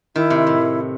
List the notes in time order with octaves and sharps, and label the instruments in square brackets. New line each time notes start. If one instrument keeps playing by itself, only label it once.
[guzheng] D#3 [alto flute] E4
[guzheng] C3
A2